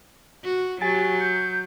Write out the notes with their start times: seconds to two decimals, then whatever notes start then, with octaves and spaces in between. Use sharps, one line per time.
0.44 F#4
0.81 F#3 G4 G#5 A6
1.21 G6 C#7